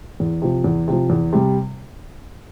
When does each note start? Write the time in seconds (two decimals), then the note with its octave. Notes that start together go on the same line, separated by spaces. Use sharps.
0.20 E2
0.42 C3 F3
0.64 E2
0.88 C3 F3
1.10 E2
1.33 C3 G3